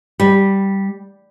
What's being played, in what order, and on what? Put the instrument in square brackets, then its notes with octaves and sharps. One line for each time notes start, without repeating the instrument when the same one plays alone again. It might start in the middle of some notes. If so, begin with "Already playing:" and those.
[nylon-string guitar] G3